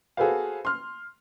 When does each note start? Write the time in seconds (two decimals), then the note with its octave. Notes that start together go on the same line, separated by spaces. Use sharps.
0.17 F#4 G#4 A4 B4 C5 F5
0.65 C6 F6